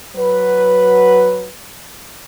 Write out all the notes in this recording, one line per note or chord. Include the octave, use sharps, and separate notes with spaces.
F#3 B4